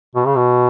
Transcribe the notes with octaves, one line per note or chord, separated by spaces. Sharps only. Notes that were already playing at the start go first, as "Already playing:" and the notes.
B2
C#3
B2